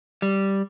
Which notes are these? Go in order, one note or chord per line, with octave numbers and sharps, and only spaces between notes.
G3